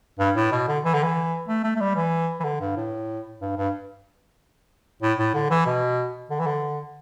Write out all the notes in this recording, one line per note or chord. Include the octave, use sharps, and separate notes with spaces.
G2
A2
B2
D3
E3
D3
E3
A3
A3
A3
G3
E3
E3
D3
G2
A2
G2
G2
A2
A2
D3
E3
B2
D3
E3
D3